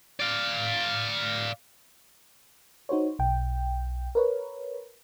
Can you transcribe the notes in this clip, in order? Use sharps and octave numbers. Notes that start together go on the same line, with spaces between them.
D5 F5
D#4 F#4 C5 C#5
B1 G5
A#4 B4 C#5